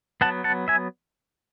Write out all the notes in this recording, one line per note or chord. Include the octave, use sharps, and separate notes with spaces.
F#3 B3 F#5 A5
F#5 A5
E5 G#5